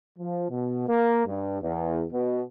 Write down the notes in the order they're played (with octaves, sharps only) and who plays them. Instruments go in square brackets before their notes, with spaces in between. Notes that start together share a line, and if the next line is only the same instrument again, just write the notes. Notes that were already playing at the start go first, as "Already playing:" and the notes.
[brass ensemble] F3
B2
A#3
G2
E2
B2